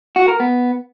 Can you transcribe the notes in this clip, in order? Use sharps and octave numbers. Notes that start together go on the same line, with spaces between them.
F#4
A#4
B3